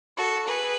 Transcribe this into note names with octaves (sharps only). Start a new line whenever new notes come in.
F#4 A4
G#4 B4